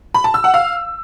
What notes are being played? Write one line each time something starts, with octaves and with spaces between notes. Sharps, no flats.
B5
A5
E6
F#5
F5